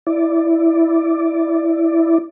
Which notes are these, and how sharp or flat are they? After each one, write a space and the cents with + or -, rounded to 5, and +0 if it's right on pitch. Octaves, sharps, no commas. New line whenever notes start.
E4 +0 D5 +0